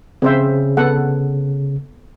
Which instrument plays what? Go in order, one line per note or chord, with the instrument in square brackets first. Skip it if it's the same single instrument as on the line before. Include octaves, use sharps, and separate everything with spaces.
[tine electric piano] C#3 [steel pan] C4 C5 E5
[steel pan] B3 A4 F#5